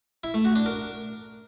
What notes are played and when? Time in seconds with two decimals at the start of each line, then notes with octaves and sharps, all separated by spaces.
0.24 E4
0.34 A3
0.45 F#4
0.55 D4
0.66 A#4